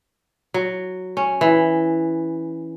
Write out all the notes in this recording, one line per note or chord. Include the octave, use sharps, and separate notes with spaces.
F#3
C#4
E3